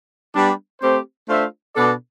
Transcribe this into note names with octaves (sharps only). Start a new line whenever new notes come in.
G3 B3 D4
A3 C4 G4 C5
A3 D4 F4 C5 E5
B2 B3 D4 A4 D5